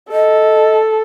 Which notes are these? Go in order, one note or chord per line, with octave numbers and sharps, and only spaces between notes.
A4 D#5